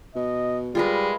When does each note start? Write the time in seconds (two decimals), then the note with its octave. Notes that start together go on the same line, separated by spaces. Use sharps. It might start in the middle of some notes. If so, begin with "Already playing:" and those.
0.15 B2 D#5
0.75 G3 G#3 F4 A#4 B4